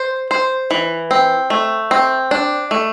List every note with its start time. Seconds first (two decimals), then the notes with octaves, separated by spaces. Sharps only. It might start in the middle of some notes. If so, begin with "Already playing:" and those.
Already playing: C5
0.31 C5
0.71 E3
1.11 C4
1.50 A3
1.91 C4
2.31 D4
2.71 A3